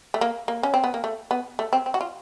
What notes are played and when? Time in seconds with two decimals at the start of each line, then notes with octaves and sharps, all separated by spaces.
0.14 A3
0.21 A#3
0.48 A#3
0.63 C#4
0.74 C4
0.84 B3
0.94 A#3
1.04 A3
1.31 B3
1.59 A3
1.73 C4
1.86 C4
1.94 F#4
2.01 F4